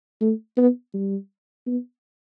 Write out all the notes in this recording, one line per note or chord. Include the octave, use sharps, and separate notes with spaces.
A3
B3
G3
B3